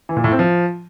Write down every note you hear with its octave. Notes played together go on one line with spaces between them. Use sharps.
E3
A#2
A2
C4
F3